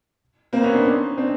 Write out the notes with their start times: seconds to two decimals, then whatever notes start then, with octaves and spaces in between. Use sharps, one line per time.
0.53 A#3 C4
0.63 B3 C#4
0.74 C4 D4
0.85 C#4 D#4
1.18 C4 D4